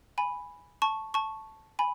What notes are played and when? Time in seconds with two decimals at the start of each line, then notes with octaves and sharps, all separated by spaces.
0.18 G#5 B5
0.82 A5 C#6
1.14 A5 C#6
1.79 G#5 B5